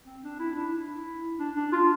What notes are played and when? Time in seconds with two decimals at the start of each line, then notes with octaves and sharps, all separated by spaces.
0.06 C4
0.23 D4
0.40 E4
0.56 D4
0.72 E4
1.39 D4
1.56 D4
1.72 F4